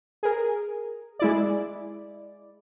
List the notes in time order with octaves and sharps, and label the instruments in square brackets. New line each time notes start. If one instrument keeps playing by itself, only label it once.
[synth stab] G#4 A#4
G#3 E4 D5